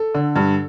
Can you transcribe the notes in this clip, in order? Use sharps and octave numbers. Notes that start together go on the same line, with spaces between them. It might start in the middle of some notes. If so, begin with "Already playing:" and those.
Already playing: A4
D3
G2